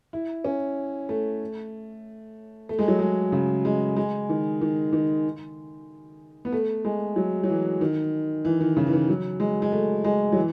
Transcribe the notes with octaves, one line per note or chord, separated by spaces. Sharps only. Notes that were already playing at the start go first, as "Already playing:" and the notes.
E4
C#4
A3
A3
G#3
F#3
G#3
C#3
G#3
G#3
D#3
D#3
D#3
B3
A3
G#3
F#3
F#3
E3
D#3
E3
D#3
C#3
E3
D#3
F#3
G#3
G#3
A3
G#3
F#3
E3